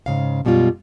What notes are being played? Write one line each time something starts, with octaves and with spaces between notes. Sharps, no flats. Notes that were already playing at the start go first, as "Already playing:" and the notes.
G#2 C#3 F5
F#2 B2 G3 G#3 F4